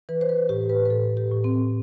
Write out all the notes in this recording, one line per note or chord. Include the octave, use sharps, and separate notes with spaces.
E3 B4
C5
B4
A2 G4
B4
B4
A2 A4
G4
A2
C4